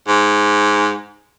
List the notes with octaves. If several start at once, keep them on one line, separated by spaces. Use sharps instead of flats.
G#2